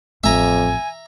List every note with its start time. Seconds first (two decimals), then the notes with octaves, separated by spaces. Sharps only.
0.24 A1 F2 E5 G#5 A#5